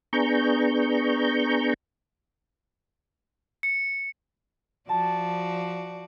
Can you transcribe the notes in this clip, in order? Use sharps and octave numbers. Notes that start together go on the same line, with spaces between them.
B3 D4 G#4 A#5 C#6 G6
C#7
F3 F#4 D5 A5